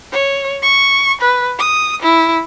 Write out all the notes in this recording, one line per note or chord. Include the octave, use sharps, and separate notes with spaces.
C#5
C#6
B4
D#6
E4